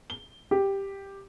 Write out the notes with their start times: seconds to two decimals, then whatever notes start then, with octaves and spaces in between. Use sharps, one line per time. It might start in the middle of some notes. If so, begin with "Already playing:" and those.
0.10 G7
0.51 G4